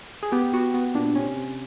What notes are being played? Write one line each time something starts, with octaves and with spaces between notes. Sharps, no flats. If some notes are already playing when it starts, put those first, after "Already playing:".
G#4
B3 G4
B3 F#4
B3
A#2 D4
C3 C#4
C3